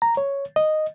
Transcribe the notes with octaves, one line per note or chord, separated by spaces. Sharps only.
A#5
C#5
D#5